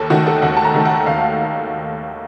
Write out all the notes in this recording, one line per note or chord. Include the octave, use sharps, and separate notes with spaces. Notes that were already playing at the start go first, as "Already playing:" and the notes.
Already playing: D#2 A4
D#3 A3 F#4
A4
D#2 F#5
A5
A#5
D#3 A3
F#5
D#2 F5